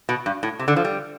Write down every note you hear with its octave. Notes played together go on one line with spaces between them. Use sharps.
B2
G2
A2
C3
D3
F3
G3